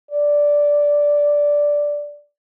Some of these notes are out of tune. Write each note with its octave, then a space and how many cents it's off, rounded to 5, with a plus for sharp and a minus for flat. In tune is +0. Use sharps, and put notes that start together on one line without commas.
D5 -5